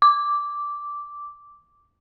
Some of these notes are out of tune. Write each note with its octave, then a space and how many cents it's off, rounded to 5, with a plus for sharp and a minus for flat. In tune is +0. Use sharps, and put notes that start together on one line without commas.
D6 -5